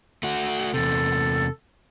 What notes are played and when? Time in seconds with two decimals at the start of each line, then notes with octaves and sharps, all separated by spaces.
0.23 A3 F#4
0.74 E2 C3 A4